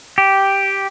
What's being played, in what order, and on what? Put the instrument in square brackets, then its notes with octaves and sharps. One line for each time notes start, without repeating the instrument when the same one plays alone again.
[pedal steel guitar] G4